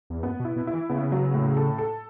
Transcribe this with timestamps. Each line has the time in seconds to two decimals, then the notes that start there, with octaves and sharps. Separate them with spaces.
0.10 E2
0.23 F#2 B3
0.40 B2
0.45 E4
0.56 B2
0.67 E4
0.73 E3
0.90 C#3 B3
1.12 F#3
1.34 A2
1.57 A4
1.78 A4